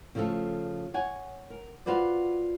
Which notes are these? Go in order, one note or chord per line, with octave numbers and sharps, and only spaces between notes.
C#3 F3 A3 F4 A4
C#5 F#5 G#5
A#4
F4 F#4 B4 C5 D5